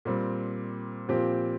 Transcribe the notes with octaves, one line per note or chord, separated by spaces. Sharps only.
A#2 G3 C4
A#2 F3 C4 G4